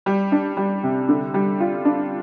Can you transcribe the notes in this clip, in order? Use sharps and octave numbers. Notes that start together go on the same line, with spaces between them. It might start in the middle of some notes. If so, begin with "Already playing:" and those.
G3
D4
G3
C3
D3
G3
F4
D4